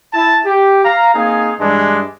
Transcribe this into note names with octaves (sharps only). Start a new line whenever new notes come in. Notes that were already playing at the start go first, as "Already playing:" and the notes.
E4 A5
G4
F5 A#5
A#3 C4 D#4 G#4 F5 G#5
G2 E3 G#3 D4